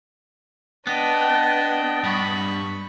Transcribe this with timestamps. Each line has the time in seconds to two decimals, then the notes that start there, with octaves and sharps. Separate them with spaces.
0.87 B3 D4 D#5 G5
2.04 G2 B5 C#6